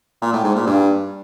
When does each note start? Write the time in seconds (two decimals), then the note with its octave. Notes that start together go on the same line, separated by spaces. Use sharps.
0.22 A#2
0.33 A2
0.44 G#2
0.55 A#2
0.66 G2